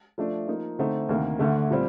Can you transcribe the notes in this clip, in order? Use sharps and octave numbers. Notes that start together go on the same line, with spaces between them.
F3 A3 D4
F3 A#3 D#4
D3 A3 C4 D#4
D2 C3 D#3 A#3
D2 D3 A3
A#2 G3 C4